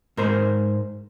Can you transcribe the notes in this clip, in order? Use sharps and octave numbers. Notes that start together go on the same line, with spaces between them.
G#2 A#4 C5